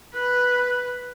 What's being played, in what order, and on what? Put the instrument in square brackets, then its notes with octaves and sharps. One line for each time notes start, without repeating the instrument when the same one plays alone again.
[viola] B4